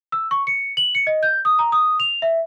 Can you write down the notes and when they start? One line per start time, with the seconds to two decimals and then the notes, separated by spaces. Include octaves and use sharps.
0.12 E6
0.31 C#6
0.47 C#7
0.77 F#7
0.95 C#7
1.07 D#5
1.23 G6
1.45 D#6
1.59 A#5
1.72 D#6
2.00 F7
2.22 E5